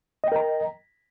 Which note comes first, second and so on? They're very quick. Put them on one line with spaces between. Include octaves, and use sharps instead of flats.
D#5 G5 A#4 A#5